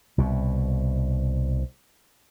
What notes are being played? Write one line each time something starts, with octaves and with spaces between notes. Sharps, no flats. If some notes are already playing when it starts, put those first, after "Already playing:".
C2 B2